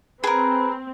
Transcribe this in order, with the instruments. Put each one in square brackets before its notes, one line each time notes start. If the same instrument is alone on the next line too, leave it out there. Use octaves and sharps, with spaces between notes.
[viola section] C4 [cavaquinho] G#4 A#4 [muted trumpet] B4